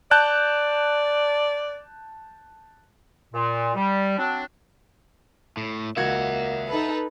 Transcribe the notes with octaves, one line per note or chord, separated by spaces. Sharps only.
D5 A5 F#6 G6
A#2
G3
F#3 C4 D4
A2
C#2 A#3 F#4 E5 F#5 G#6
D#4 A4 B4